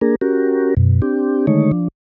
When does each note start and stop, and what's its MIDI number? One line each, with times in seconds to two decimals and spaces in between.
0.01 0.15 58
0.01 0.15 62
0.01 0.15 68
0.01 0.15 70
0.21 0.74 61
0.21 0.74 66
0.21 0.74 67
0.21 0.74 70
0.77 1.01 42
0.77 1.01 47
1.02 1.46 60
1.02 1.46 62
1.02 1.46 67
1.47 1.71 50
1.47 1.71 51
1.47 1.71 56
1.47 1.71 57
1.47 1.71 63
1.47 1.71 73
1.71 1.88 53
1.71 1.88 62